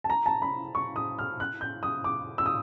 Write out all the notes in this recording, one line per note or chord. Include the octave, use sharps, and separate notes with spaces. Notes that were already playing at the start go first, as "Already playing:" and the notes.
A5
A#5
A5
B5
C#6
D#6
F6
F#6
G6
D#6
D6
E6
D#6